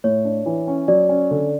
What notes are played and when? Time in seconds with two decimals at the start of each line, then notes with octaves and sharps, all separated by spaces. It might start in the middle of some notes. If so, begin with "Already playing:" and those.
0.04 A2 C#5
0.25 D4
0.46 E3
0.67 C#4
0.88 F#3 D5
1.09 C#4
1.31 D3